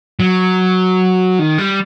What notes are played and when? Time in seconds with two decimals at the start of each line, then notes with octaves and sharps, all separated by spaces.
0.20 F#3
1.39 D#3
1.58 G3